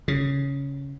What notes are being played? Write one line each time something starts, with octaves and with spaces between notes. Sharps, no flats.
C#3